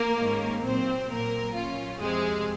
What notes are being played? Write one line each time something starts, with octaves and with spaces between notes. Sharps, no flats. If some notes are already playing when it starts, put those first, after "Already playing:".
Already playing: A#3 A#4
G#2 D#3 G#3 C#4
A#2 F#3 A#3 C4 C5
A#2 F#3 A#3 C4 A#4
A#2 F#3 C#4 F4
F2 C3 F3 G#3 C4 G#4